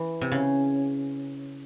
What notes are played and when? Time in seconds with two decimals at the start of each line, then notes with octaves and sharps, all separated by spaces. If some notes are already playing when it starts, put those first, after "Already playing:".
Already playing: E3
0.21 C3
0.32 C#3